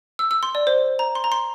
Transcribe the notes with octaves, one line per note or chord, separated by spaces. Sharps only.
E6
E6
C6
D5
C5
A#5
C6
A#5
C6